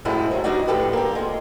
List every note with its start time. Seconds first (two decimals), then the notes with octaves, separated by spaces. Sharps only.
0.05 F#2 A2 C3 F3 G#3 E4
0.31 G#2 D#3 F#3
0.44 F#3 G3 B3 D4 D#4 F#4
0.67 F2 A2 D3 G4 A4 B4
0.93 A#3 G4
1.15 G#3 F4